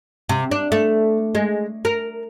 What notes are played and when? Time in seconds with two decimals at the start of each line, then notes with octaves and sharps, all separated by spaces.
0.29 C3
0.51 D4
0.72 A3
1.35 G#3
1.85 A#4